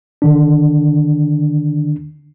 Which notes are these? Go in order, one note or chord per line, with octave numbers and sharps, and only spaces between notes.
D3 D#3 D4